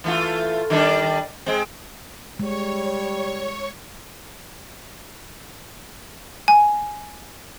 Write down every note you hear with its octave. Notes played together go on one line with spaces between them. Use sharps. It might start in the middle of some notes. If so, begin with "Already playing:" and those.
E3 A3 F4
D#3 G3 D4
G#3 C4
G3 G#3 C#5 C#6
G#5